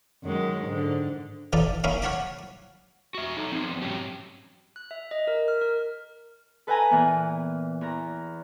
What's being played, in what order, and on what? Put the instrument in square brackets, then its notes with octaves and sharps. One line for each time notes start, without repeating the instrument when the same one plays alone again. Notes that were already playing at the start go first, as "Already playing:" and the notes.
[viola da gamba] F#2 D#3 G#3
G#2 D3
[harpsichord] E3 D#4 F4 A4 D5
A#3 C#4 D#4 E4 E5 F5
C#5 F5 F#5 A5 B5 D6
[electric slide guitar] F#4 E5
D#4 A4
F3 B3 C4
G#2 F#3 C#4 G4
[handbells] F#6
E5
D#5
A#4
F6
A#4
[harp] A4 B4 E5 G5 G#5 A#5
A#2 E3 B3
E2 A#5